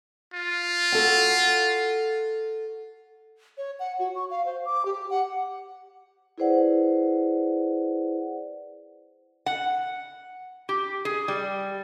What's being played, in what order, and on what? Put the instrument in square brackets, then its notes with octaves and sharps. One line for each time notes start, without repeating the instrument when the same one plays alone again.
[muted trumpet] F4
[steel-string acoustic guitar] F#4 A4
[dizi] C#5
F#5
F#4
C#6
F5
C5
D6
G4
F#5
[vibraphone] E4 G#4 B4 C5 D5 F#5
[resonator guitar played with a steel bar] F#5
G4
G#4
G3